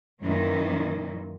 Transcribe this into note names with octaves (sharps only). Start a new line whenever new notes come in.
F#2 A#2 D#3 E3 C#4